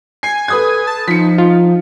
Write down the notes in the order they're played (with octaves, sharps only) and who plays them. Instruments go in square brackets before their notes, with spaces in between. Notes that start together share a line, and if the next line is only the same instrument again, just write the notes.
[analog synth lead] G#5 [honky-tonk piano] C7
[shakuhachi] A4 [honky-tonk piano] B4 D#6 G#6
[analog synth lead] A5
[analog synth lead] F3 [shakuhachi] D#4 [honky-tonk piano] B6 C#7
[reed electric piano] F4